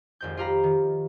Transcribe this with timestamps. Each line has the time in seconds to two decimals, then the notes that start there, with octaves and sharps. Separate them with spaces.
0.21 G#1 F2 G6
0.37 F4 G4 F5 A#5 B5
0.64 D#3